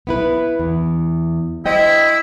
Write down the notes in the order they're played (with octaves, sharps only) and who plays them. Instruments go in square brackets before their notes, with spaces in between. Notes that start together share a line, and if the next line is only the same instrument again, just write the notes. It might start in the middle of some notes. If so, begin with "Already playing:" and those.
[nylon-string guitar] B3 E4 B4
E2
[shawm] E4 [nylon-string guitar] C5 D#5 G5